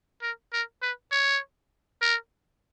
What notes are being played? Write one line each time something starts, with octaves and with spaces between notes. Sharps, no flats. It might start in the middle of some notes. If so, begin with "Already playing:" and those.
A#4
A#4
B4
C#5
A#4